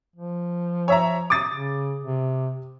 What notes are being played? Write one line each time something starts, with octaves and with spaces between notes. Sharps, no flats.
F3
C#5 E5 A#5
D6 D#6 A6
C#3
C3